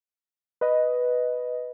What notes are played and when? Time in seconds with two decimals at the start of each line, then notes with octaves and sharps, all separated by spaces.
0.61 B4 D#5